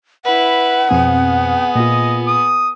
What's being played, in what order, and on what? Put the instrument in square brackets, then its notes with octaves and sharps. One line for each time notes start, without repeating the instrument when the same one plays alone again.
[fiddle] E4 B4 [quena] F#5
[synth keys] F2 B2 C4 [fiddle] B3 G#4
[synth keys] A#2 F4 [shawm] D#5
[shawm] D#6